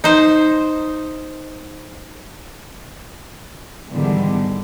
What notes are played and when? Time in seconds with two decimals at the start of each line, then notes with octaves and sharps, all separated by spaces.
0.04 D#4 C5
3.91 E2 G#2 D3 D#3 G3